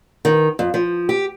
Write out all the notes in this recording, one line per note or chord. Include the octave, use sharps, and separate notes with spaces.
D#3
F2
F3
G4